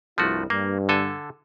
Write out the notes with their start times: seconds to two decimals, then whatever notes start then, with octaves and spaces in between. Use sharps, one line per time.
0.18 C2 G2 F3 A3 E4 F#4
0.50 G2 A#3
0.89 D3 A4 G#5